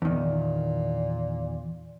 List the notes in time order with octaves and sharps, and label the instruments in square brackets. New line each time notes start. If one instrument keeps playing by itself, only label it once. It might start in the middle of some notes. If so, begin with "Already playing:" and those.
[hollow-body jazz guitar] E2 D#3 [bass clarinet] A#2